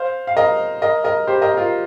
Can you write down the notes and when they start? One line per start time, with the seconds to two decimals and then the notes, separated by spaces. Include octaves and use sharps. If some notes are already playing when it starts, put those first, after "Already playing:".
Already playing: C5 F5
0.27 F5
0.37 A#4 D#5
0.82 A#4 D#5
1.04 A#4 D#5
1.27 G4 C5
1.42 A#4 D#5
1.57 F4 A#4